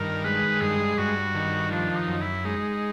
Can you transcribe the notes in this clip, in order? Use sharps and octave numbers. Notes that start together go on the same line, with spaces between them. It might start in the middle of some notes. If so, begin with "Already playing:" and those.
Already playing: G2 D#3 A#4
G#3 B4
G2 G#4
G2 F#4
D#3
F3 D4
D#4
F#2
E4
G#3 D#4